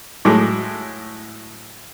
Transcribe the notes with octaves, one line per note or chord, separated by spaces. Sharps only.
A2 F#3 G#3 D6